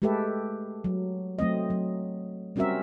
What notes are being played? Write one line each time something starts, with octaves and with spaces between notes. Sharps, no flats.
G#3 A3 G4 A4 B4 E5
F#3
F#3 A3 C4 D#5
F#3
G3 C4 C#4 F#4 A#4 E5